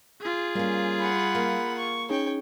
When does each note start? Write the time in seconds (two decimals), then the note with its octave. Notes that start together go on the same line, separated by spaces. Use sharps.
0.20 F4 G#4
0.55 G3 A#3 C#4
1.00 F#5 B5
1.35 A#3
1.78 C#6
2.10 C#4 D#4 G#4 C#5 G5